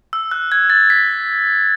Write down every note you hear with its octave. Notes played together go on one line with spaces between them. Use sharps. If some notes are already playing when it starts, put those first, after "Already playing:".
E6
F#6
G#6
A6
B6